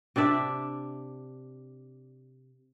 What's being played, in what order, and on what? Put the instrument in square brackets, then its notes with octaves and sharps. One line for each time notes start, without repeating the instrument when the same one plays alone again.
[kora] C3 D4 D5 E5